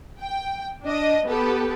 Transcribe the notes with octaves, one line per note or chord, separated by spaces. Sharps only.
G5
D4 D#5
B3 G4 A4 B4